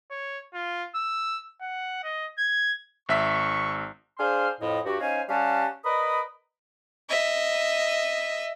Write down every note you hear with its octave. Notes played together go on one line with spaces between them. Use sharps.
C#5
F4
E6
F#5
D#5
G#6
G#1 E5 C#6 B6
D4 G#4 C5 F5 C6 F6
F2 A2 D#5
G2 F#4 G4
C#4 D#4 C5 F5 G#5
G3 C#4 G4 F5 F#5 A5
A#4 B4 D5 D#5 B5 D#6
D#5 E5